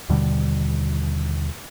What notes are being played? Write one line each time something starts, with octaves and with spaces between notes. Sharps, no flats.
D#2 B2 D3 G3